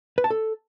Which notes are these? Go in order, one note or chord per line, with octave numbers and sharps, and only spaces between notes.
B4
A5
A4